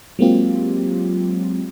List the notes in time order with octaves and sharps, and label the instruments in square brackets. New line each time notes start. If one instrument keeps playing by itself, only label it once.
[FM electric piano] F#3 G#3 A#3 C4 F4 G4